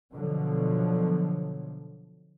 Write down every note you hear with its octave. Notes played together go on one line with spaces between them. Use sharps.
B2 D3 F3 F#3